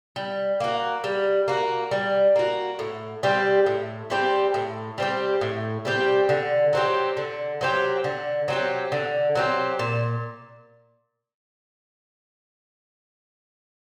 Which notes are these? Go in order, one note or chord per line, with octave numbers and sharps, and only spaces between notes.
G3
A#3 F#4
G3
A#3 F#4
G3
A#3 F#4
A2
G3 C4 G4
A2
G3 C4 G4
A2
G3 C4 G4
A2
G3 C4 G4
D3
F#3 C4 G4
D3
F#3 C4 G4
D3
F#3 C4 G4
D3
F#3 C4 G4
A#2